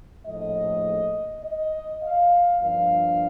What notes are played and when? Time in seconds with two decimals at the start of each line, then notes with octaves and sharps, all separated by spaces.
0.25 A#1 A2 F3 A3 D#5
1.43 D#5
2.02 F5
2.61 G2 F3 A#3 D4 F5